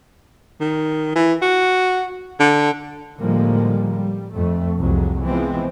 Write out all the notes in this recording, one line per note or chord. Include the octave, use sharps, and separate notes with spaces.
D#3
E3
F#4
D3
A2 D3 F3 G3 G#3 A#3
G3
F2 A3
C2 F2 F#3 G#3
E3 F3 G#3 B3 C4